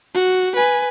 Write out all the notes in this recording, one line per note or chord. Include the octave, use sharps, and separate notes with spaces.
F#4
B4 G#5